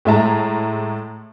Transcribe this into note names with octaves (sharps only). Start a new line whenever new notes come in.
A2 G#3 E5 A5 A#5